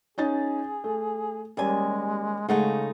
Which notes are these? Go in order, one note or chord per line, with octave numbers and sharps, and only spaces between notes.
C#4 D#4 G#4 A6
A3
D#2 G3 G#3 C#4 G#5
C#3 G#3 A3 D#4 F#5